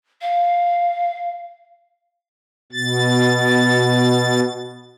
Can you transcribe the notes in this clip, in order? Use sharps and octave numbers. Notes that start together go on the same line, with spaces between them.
F5
B2 A6